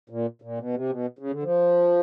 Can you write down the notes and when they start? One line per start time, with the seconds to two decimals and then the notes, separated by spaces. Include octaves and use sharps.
0.10 A#2
0.42 A#2
0.58 B2
0.74 C3
0.89 B2
1.19 C#3
1.31 D3
1.43 F3